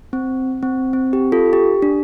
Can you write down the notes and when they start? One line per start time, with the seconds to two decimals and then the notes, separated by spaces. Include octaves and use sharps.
0.13 C4
0.63 C4
0.93 C4
1.13 G4
1.32 F4 A4
1.53 G4
1.82 D4